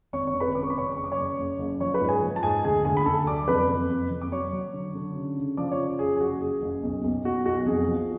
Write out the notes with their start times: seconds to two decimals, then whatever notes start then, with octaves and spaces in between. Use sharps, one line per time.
0.13 G#1 C#5 C#6
0.27 C#5 C#6
0.34 G#1
0.40 B4 B5
0.55 F#2 D6
0.63 C#6
0.70 B5
0.76 C#3 C#5 C#6
0.97 F#1 C#6
1.04 D6
1.12 C#5 C#6
1.18 F#1
1.39 F#1
1.59 F#1
1.80 F3 C#5 C#6
1.94 B4 B5
2.01 G#2
2.09 G#4 G#5
2.22 F3
2.36 A5
2.43 G#2 G#4 G#5
2.64 D2 G#4 G#5
2.85 D2 G#4 G#5
2.97 B5
3.06 D2 A4 A5
3.27 F#3 D5 D6
3.48 F2 B4 B5
3.69 F2
3.90 F2
4.11 F2
4.22 D6
4.32 F#3 C#5 C#6
4.53 F#3
4.73 D3
4.95 D3
5.16 C#3
5.37 C#3
5.57 F3 D5 D6
5.72 C#5 C#6
5.78 C#3
5.99 F#1 G#4
6.16 G#4
6.20 F#1 F#4
6.41 F#1 G#4
6.62 F#1
6.83 B1
7.04 B1
7.25 B1 F#4
7.46 B1 F#4
7.59 F#4
7.66 F2 G#4
7.87 F3